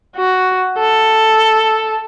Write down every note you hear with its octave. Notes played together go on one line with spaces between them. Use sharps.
F#4
A4